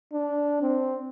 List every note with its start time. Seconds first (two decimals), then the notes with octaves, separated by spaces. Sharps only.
0.13 D4
0.62 C4